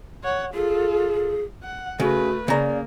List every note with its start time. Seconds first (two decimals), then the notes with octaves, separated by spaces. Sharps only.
0.24 C#5 F#5
0.54 F4 G#4 A4
1.63 F#5
2.00 C#3 A3 F#4 B4
2.48 C#3 A#3 D5 A#5